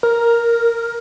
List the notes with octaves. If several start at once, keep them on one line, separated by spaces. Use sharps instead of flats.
A#4